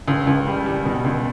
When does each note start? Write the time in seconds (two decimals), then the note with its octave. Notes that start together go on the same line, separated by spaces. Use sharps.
0.08 C#2
0.27 C#2
0.47 G3
0.66 G3
0.86 B2
1.04 C#2